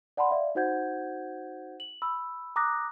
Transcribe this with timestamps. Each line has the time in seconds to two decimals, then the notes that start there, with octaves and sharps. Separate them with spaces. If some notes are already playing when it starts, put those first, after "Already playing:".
0.17 D5 F#5 A5 B5 C6
0.31 D5 E5 F5
0.55 D#4 F#4 C5 F#5 G6 G#6
1.80 F#7
2.02 B5 E6
2.56 A#5 D6 D#6 F#6 A#6